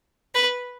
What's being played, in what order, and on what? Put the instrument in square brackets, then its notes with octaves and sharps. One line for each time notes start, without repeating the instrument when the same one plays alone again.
[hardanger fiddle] B4